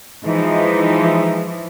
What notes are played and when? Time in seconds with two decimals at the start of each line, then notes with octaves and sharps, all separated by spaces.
0.25 E3 F3 G#3 D#4